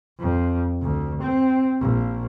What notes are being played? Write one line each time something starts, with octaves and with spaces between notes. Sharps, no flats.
F2
D2
C4
A#1